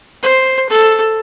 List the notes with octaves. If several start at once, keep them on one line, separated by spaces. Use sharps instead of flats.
C5
A4